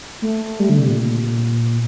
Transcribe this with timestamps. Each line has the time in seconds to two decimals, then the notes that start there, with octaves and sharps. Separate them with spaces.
0.22 A3
0.60 G3
0.69 D3
0.79 C3
0.88 A#2